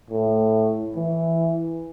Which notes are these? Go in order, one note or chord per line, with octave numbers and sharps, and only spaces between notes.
A2
E3